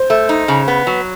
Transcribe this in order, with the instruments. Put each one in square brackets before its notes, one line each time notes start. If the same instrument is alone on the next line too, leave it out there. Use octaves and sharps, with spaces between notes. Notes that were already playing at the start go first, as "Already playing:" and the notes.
Already playing: [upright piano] C5
[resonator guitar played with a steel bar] A3
D#4
C#3
B3
F#3